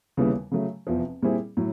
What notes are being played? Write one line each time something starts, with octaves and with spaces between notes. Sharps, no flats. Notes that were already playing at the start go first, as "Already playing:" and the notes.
D#2 C#3 E3 G3 B3
C#3 F#3 A3
F1 E2 C3 F3
A#2 G3 C4 E4 G#4
A2 F#3